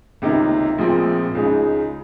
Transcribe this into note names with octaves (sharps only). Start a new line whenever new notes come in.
C#2 C3 D#3 A#3 D#4
A#1 A#2 F3 G#3 C4
C#2 C#3 G#3 D#4